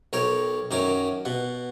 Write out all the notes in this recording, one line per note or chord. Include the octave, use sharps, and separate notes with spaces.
B1 A#4 C#5 G5
F#2 D#3 C#4 A#4 D6
B2 F#5